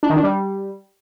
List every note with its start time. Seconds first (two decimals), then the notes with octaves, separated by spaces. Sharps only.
0.03 D4
0.10 D#3
0.16 D4
0.23 G3